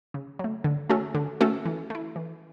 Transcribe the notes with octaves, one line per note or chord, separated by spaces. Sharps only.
C#3
F#3 A3
D3
A3 C#4 F#4 A4
D3
A3 C#4 F#4 A4
E3
A3 E4
E3